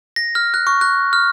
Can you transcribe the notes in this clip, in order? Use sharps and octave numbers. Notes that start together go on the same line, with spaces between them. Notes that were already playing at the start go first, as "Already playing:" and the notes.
A#6
F6
F#6
C#6
F#6
F6